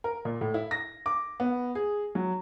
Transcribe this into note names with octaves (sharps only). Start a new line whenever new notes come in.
A#4
A#2
A2
E4
A#6
D6
B3
G#4
F#3